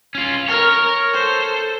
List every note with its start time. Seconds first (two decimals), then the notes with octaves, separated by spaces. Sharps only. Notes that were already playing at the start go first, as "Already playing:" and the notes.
0.15 C#4 F4
0.48 A#4 C#5 F6
1.13 A4 C5